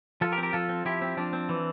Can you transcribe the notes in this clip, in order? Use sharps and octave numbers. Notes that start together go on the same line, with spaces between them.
F3 F4 A4
G4 A#4
C4
G4 A#4
F3 F4 A4
C4
F3 E4 G4
C4
F3 D4
C4
E3